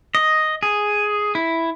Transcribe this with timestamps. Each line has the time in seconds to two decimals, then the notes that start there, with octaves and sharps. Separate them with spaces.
0.15 D#5
0.63 G#4
1.35 E4